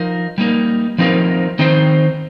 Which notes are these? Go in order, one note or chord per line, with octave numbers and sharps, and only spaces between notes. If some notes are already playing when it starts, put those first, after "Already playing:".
Already playing: F3 D#4 A#4
G3 A#3 D#4 A#4
F3 C4 D#4 A#4
D#3 C4 D#4 C5